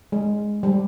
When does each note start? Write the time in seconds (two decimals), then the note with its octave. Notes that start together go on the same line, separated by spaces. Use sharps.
0.12 G#3
0.63 G3